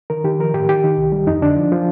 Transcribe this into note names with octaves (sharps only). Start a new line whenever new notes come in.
D#3 A#4
D#3 G4
F3 A#4
A2 G4
D#3 G4
D#3
C2
G3
F2 D#4
D3 D4
F3
F3